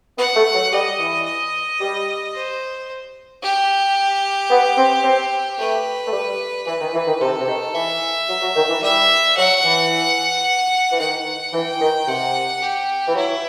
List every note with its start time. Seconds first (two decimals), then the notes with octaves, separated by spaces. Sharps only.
0.17 B3 F#5
0.36 A3
0.54 F#3
0.72 G3 D#5
0.99 E3
1.26 D#5
1.80 G3
2.34 C5
3.42 G4
4.50 B3
4.77 C4
5.04 C4
5.59 A3 B4
6.07 A3
6.12 G3
6.66 E3 B4
6.80 D#3
6.94 E3
7.07 D#3
7.20 C3 A4
7.40 C3
7.47 D#3
7.75 E3 E5
8.28 F#3
8.42 F#3
8.56 D#3
8.69 E3
8.82 G3 E5
9.37 F#3 F#5
9.64 E3
10.92 E3
10.99 D#3 F#5
11.53 E3 G5
11.81 D#3
12.07 C3 F#5
12.62 G4
13.08 E3
13.15 F#3 E4